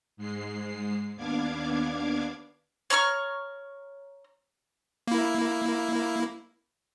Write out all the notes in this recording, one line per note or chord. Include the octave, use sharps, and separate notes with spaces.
G#2 G#3 C7
D#2 B3 D4 F5 D6 G#6
C#5 A#5 C#6 F6
A#3 E4